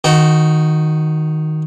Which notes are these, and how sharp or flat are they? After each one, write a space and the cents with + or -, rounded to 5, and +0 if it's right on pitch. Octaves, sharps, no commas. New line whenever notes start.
D#3 +0 F#4 +0 G5 -35